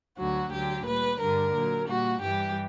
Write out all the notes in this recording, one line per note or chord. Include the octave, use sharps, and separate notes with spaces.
D2 D3 F#3 F#4
D2 D3 F#3 G4
A#2 G3 B4
G2 D3 G3 A#4
A#2 F#3
A#2 G3 F#4
G2 E3 G3 G4